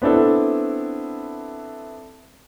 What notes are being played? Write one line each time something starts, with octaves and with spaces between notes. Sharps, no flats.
B3 C4 D4 E4 A4